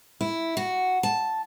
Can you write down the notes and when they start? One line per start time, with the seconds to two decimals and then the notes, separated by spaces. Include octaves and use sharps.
0.21 E4
0.57 F#4
1.03 A5